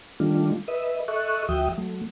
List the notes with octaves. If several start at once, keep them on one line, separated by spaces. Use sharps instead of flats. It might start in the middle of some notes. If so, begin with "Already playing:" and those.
D#3 G3 A3 D4 F4
B4 D#5 E5
A4 D#5 E5 C#6 F#6
D2 F3 F#4 E5 G5 D#6
F#3 A3